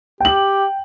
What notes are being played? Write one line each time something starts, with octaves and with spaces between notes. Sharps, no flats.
G4 G5 F#7